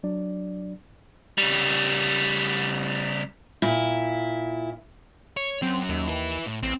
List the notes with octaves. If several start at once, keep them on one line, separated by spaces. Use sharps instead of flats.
F#3 D4 D5
C#3 G3
A#2 E4
C#5
F#3 C4 C#4
D#2
E4 B4
A2
A1 C4